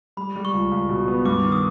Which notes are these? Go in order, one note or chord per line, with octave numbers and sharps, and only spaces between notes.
G3 B5
G3
C#6
C#2
C#2
B2
B3
G2 D6
D#3
D#6